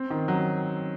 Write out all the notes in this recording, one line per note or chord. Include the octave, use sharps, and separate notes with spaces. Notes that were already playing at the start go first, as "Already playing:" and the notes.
Already playing: C4
D#3
F#3